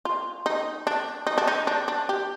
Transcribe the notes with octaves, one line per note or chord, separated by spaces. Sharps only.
F4
D#4
D4
D#4
D4
D#4
D4
D4
G4